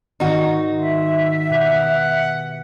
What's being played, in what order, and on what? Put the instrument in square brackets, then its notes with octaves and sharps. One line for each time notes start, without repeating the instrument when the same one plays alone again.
[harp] G#2 D#3 [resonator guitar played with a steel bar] D#4 F#4
[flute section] E5 [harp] C6
[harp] B2 G4 [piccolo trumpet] F#5